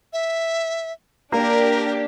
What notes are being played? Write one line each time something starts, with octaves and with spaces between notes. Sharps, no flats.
E5
A#3 D4 G4 A#4